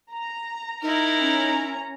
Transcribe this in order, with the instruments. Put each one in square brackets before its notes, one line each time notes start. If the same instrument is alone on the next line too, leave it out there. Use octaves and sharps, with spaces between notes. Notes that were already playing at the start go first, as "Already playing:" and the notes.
[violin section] A#5
[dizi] D#4 [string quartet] E4 A#4
[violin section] C#4 A#5